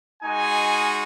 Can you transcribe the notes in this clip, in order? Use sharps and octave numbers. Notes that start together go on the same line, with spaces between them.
G#3 D#4 F#4 G#5